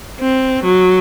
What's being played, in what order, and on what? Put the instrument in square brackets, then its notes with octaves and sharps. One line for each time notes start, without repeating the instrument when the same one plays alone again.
[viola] C4
F#3